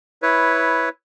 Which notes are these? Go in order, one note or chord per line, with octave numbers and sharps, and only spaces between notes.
E4 B4 C#5